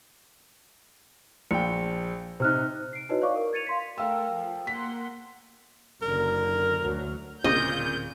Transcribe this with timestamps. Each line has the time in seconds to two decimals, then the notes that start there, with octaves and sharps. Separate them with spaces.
1.51 A#1 G5 C#7
2.40 C3 D#4 C5 F6 F#6
2.93 C7 D7
3.09 D#4 E4 F#4 B4 C#5 D#5
3.21 C#5 D5 F5 C#6 D6
3.36 A#4
3.53 G#6 A6 C#7 D#7 F7
3.67 F5 C6 B6
3.98 A3 A4 A#4 F5 G5 E6
4.29 F3
4.67 A#3 F#5 C6 B6
6.02 F#1 D3 A#4
6.79 D2 F#3
7.44 D1 A#2 C#3 C4 D#5 G6